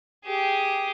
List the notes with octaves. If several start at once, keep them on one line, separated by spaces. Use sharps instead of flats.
G4 G#4